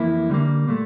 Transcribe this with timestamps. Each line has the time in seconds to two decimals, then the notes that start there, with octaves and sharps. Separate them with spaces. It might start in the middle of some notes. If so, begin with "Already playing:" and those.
Already playing: F2 E3 A#3 E4
0.30 D3 G3 A#3
0.68 A#2 A3